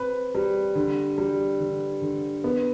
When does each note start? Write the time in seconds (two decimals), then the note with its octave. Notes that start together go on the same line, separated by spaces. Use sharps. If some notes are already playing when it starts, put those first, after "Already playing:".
Already playing: C4 B4
0.35 G3
0.75 D3
1.18 G3
1.60 D3
2.02 D3
2.44 B3